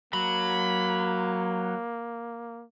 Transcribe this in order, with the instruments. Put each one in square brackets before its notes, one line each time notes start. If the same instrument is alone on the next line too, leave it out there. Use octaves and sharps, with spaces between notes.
[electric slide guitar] F#3 [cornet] A#3 [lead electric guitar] B5